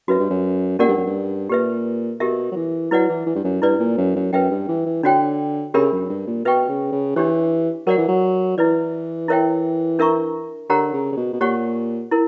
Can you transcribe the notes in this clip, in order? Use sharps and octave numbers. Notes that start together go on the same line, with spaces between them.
F#2 F#4 B4 E5
G2
F#2
A#2 C#4 G4 A#4 D5 F#5
G2
F#2
G2
A#2 G4 B4 E5
B2 G4 A#4 E5
F#3
E3
F#3 E4 B4 D5 F#5
E3
E3
G2
F#2
G2 E4 B4 D5
A#2
F#2
F#2
F#2 B4 E5 G5
G2
E3
E3
D3 D4 F#4 C#5 G5
C#3 D4 G4 A#4 E5 B5
F#2
G2
A#2
B2 B4 E5 G5 C#6
C#3
C#3
E3 D4 G4 C#5
F#3 A#4 D5 F#5
E3
F#3
E3 E4 B4 D5
E4 A#4 C#5 E5 G5
D4 A#4 E5 A#5 C#6
D3 G4 A#4 C#5 F#5 A#5
C#3
C#3
B2
B2
A#2 G4 C#5 F#5 C#6
E4 A#4